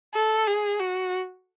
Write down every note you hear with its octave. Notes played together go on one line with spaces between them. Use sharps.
A4
G#4
F#4